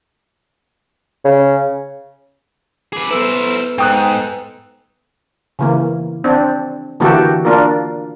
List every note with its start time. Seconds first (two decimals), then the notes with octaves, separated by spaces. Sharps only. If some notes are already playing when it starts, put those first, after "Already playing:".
1.25 C#3
2.93 G#4 B4 D6
3.11 B3 E4 A4 B4 C5 A#5 E6
3.78 G#2 G5 D#6 F#6
5.59 C#3 E3 A#3
6.24 C4 D4
7.00 D3 E3 A#3 F#4 G4 A4
7.45 A#3 D4 F4 A#4